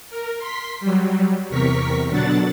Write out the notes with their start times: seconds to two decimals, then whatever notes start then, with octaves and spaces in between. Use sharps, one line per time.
0.10 A#4
0.39 C6 B6
0.80 F#3 G3
1.50 E2 C3 A#4 C#6 B6
2.09 B2 D3 F#3 D4 F#5 A6